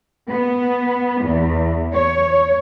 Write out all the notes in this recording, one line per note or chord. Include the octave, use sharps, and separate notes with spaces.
B3
E2
C#5